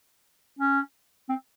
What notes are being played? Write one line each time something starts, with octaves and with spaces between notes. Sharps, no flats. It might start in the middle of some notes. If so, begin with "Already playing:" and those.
C#4
C4